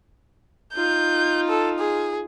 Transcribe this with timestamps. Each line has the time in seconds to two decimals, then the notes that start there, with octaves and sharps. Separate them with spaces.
0.75 D#4 F4 G6
1.49 A4
1.79 G#4